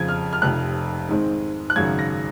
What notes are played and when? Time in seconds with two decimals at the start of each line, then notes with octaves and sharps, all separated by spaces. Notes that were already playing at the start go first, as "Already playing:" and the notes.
Already playing: F2 C#3 F3 G#6
0.08 F6
0.33 F6
0.42 F1 F2 C3 F#6
1.09 G#2 D#3 G#3 C4
1.70 F#6
1.76 G#1 F#2 C#3 F#3 G#6
1.99 A#6